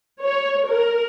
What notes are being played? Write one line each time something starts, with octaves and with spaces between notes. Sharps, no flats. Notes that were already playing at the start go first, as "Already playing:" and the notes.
C#5
A#4